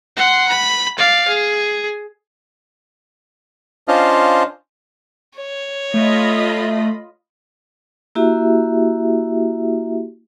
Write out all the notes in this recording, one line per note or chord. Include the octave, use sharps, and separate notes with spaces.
F#5 C6
B5
D5 F5
G#4
C#4 D4 F4 C5 D#5 F5
C#5
A3 F4 D#5 B5
A#3 E4 F#4 G4 E5